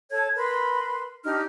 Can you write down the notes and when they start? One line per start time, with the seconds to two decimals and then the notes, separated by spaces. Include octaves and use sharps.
0.11 A4 C#5 A5 G#6
0.36 A#4 B4 B5 C6
1.25 D4 D#4 G4 F6